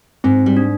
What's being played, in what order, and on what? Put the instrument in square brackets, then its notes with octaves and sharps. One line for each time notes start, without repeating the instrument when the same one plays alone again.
[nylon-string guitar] G#2 [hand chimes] C4
[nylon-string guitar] G3
[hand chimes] D4